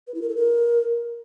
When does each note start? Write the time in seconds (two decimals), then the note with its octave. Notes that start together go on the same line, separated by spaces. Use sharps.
0.07 B4
0.15 E4
0.22 A#4
0.29 A4
0.36 A#4